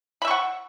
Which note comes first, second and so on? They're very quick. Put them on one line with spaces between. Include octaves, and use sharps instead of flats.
B5 E5 C#6 F#5